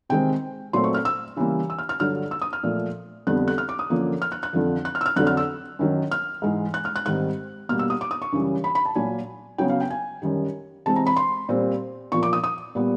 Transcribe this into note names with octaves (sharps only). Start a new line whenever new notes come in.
C3 D#3 G#3 C4 G5
A#2 F#3 A3 C4 C6
C#6
F6
E6
C#3 E3 G3 A#3
E6
F6
F6
G2 D3 F#3 F6
E6
D#6
F6
A#2 F3 A3
F2 D3 G3 B3 F#6
F#6
F6
D6
D#6
F#2 D3 F3 A#3
F6
F#6
F#6
F2 D3 F3
F#6
F6
E6
F6
F2 D3 F#3 F#6
F6
E6
F#2 D#3 F#3
F6
G#2 E3 G#3
F#6
F6
F#6
G#2 D#3 G3 C4 F#6
B2 G3 A#3 F6
E6
D#6
D6
D#6
C#6
F#2 C#3 E3 G3
B5
B5
A5
A#2 F#3 A#3 G#5
C#3 F#3 B3 G5
F5
G5
G#5
F#2 D#3 G3
C3 E3 G#3 C4 A5
A#5
B5
C6
A#2 G3 C4
A#2 F3 A#3 C#6
D6
D#6
D#6
A#2 G3 B3